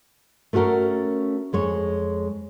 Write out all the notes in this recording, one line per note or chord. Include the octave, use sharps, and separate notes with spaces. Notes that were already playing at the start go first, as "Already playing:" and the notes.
A3 C#4 F#4 A4 A#4
F2 G#3 C#5